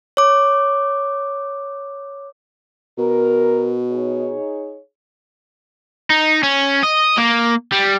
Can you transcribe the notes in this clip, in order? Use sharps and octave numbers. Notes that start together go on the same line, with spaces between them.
C#5 D6
B2 A#4
D#4 G#4 C#5
D#4
C#4
D#5
A#3
G3